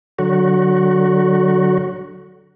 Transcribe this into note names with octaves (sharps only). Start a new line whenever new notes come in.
D3 F#3 F#4